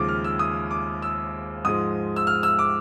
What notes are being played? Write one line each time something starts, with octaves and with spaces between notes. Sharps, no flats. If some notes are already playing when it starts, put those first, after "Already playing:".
Already playing: D#2 C#3 F3 G#3 D6
F6
E6
D#6
D6
E6
G#2 F3 G#3 D#6
E6
F6
E6
D6